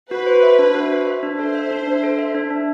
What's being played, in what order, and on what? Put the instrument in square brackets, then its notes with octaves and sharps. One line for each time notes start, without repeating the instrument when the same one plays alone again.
[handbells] F#4 [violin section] B4
[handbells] C5
E5
D4
F#4
C5
E5
D4
[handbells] A4 [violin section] C5
[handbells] E5
D4
D4
A4
E5
D4
D4